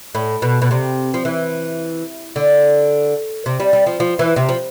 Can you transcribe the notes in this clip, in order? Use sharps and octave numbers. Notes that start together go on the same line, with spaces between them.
A2
B2
B2
C3
F3
E3
D3
C3
G3
G3
F3
F3
E3
C3
F3